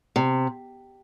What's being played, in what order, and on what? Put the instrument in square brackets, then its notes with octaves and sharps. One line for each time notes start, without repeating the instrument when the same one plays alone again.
[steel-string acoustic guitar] C3